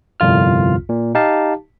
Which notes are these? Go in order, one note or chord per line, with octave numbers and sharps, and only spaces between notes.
G1 C2 F2 F4 F6
A#2
D#4 G4 F5 A5